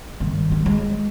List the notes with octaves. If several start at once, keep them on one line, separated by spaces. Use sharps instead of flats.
G2 D#3
G3
G#3